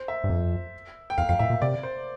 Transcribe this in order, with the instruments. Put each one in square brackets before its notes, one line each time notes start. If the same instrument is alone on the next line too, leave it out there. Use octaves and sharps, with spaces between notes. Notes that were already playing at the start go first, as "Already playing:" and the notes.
Already playing: [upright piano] C5
E5
[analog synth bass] G2
F2
[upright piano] G5
[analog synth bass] E2 [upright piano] F5
[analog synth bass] F2 [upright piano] F5
[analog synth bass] A2 [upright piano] E5
[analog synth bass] A#2
[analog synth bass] C3 [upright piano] D5
[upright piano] C5